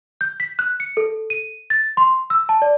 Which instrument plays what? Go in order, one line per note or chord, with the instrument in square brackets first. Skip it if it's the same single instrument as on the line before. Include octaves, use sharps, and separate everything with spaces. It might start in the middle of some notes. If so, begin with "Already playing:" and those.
[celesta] G6
B6
F#6
C#7
A4
D#7
A6
C6
E6
A5
D5